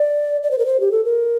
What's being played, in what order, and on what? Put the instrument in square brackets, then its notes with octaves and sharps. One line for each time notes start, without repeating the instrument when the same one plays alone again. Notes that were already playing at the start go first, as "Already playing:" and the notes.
Already playing: [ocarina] D5
D5
C5
A#4
C5
G4
A4
A#4